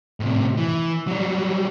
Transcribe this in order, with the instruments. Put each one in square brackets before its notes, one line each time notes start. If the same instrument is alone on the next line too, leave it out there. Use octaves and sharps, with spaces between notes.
[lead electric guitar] A2 C3
E3
F#3 G3